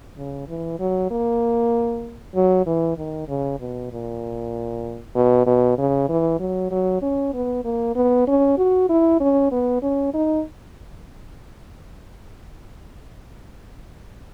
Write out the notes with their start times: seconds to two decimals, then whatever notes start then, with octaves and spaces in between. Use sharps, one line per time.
0.17 C#3
0.48 E3
0.79 F#3
1.11 A#3
2.35 F#3
2.66 E3
2.97 D#3
3.28 C#3
3.60 B2
3.91 A#2
5.15 B2
5.46 B2
5.78 C#3
6.09 E3
6.40 F#3
6.71 F#3
7.02 C#4
7.34 B3
7.64 A#3
7.96 B3
8.27 C#4
8.58 F#4
8.89 E4
9.20 C#4
9.52 B3
9.82 C#4
10.14 D#4